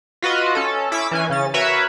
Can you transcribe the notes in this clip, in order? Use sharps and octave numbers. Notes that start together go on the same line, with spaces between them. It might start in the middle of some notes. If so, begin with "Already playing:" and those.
F4 F#4 B4 D#5
C#4 A4
C#4 E4 D6 E6 B6
E3 C#4 G#5
C#3 C#4 A6
F#4 A#4 B4 C#5 E5 B5